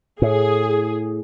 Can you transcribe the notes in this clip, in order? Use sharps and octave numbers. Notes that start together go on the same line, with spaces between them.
A2 G#4